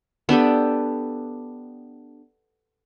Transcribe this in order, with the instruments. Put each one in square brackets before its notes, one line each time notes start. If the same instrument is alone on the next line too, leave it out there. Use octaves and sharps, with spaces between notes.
[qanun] B3 D4 G4 A4